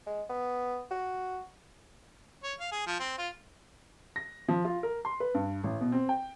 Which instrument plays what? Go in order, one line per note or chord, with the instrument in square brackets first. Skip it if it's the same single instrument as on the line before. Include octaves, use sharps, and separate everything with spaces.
[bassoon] G#3
B3
F#4
[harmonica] C#5
F5
G#4
F3
C4
F4
[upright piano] A#6
F3
F4
A#4
C6
B4
G2
A1
B2
C4
G5